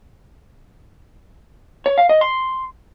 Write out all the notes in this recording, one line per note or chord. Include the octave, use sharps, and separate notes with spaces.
C#5
F5
D#5
C6